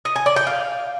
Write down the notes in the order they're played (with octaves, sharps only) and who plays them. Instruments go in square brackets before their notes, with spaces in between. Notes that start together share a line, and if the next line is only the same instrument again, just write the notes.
[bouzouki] D#5
G#5
D5
G5
F5